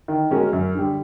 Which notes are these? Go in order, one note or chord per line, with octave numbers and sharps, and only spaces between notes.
D#3
G#3 C#4 F#4 A#4
F#2
D3 G3